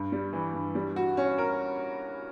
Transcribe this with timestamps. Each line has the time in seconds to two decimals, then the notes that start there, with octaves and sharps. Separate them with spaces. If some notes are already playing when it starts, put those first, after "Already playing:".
Already playing: G2
0.12 G3
0.33 E3
0.54 G2
0.75 G3
0.96 F#4
1.17 C#4
1.38 A#4